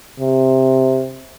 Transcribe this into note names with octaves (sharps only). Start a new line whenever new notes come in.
C3